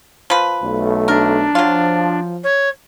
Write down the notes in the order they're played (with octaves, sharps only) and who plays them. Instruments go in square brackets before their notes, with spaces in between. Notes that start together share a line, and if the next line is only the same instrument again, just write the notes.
[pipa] F3 B4
[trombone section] B1 A3
[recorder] D4 [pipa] A#4
[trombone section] F3 [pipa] F#3 F4
[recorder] C#5